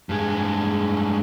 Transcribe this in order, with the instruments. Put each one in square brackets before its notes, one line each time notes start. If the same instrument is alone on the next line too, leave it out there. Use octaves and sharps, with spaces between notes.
[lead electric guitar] G2 G#3